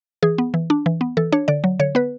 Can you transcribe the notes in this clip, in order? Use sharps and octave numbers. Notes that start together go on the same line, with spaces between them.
E3 G#4
B3
E3
D4
E3
B3
E3 A4
D4 C#5
D3 D5
F#3
D3 C#5
B3 B4